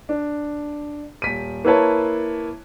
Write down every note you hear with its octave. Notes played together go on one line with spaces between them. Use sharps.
D4
D#1 B6 D#7
A#3 E4 B4 C#5 A5